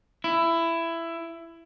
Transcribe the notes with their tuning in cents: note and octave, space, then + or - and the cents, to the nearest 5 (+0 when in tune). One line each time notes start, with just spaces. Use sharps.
E4 +15